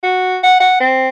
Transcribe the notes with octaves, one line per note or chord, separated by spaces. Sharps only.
F#4
F#5
F#5
C4